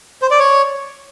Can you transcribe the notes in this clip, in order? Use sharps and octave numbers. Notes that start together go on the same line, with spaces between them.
C5
D5
C#5